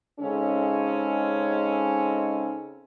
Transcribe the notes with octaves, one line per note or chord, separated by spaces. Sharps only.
C#3 G#3 C4 C#4 D#4 A4